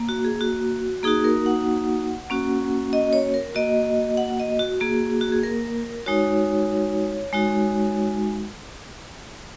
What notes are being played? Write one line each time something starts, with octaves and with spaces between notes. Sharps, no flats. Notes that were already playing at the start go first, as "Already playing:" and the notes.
Already playing: A#3
F#4
G#4
F#4
A#3 D#4 F#4 G#4
A#4
F#5
A#3 C#4 F#4
D#5
C#5
A#4
A#3 F#4 D#5
F#5
D#5
F#4
A#3 F#4 G#4
F#4
G#4
A#4
G#3 D#4 F#4 C#5
G#3 D#4 F#4